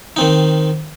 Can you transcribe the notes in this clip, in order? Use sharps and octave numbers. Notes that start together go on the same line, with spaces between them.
D#3 C4 D#4